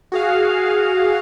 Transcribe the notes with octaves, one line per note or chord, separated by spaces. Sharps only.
F#4 G#4 F5